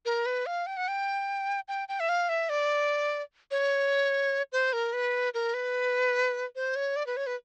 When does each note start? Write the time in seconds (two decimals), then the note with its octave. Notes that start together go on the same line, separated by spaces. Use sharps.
0.06 A#4
0.26 B4
0.46 F5
0.67 G5
0.77 F#5
0.88 G5
1.68 G5
1.89 G5
2.00 E5
2.09 F5
2.29 E5
2.49 D5
3.51 C#5
4.52 C5
4.73 A#4
4.93 B4
5.34 A#4
5.54 B4
6.56 C5
6.76 C#5
6.96 D5
7.07 B4
7.17 C#5
7.27 B4